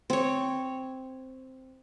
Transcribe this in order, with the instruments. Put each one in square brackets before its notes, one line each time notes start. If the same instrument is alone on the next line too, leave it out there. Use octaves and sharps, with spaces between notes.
[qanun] C4 C#5